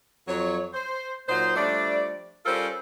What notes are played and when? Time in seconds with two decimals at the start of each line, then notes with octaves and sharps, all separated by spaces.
0.28 F2 F#3 C#5
0.73 C5
1.28 A#2 F#3 D#4 C5
1.56 F3 G3 A3 D4 D5
2.45 G3 C#4 F4 A4 A#4 C5